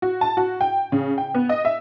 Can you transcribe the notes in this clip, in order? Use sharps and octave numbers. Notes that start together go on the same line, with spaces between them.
F#4
A5
F#4
G5
C#3
G5
B3
D#5
E5